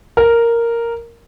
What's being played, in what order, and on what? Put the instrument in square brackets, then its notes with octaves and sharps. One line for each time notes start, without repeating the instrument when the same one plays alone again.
[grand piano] A#4